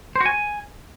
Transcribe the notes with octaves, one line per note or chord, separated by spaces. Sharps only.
C5
F#4
G#5